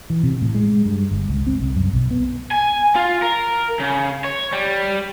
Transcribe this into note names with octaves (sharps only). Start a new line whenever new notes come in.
E3
C3
A2
G#3
G2
G1
C#2
C4
C2
F#2
B1
B3
G#5
F4
A#4
C#3
C#5
G3